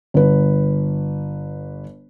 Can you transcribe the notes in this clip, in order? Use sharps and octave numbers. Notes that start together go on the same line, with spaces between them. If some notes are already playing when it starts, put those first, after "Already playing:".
G1 B4